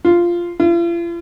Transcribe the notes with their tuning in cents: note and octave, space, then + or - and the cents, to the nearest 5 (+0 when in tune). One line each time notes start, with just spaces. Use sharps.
F4 -10
F4 -45